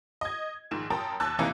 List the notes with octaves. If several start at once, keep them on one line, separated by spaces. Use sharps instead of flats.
D#5 G#6
A#1 G#2 D#3 E7
F#2 A#4 G5 A5 D#6
D#2 A5 E6 F#6
F2 C3 E3 A#3 D#4 E4